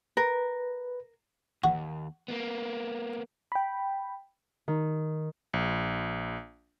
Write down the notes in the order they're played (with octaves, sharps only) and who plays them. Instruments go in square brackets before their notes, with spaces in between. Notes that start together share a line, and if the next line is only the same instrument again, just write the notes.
[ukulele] A#4 [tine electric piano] B4
[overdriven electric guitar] D#2 [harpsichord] F#4
[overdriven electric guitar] A#3 B3
[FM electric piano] G5 B5
[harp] D#3
[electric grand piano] A#1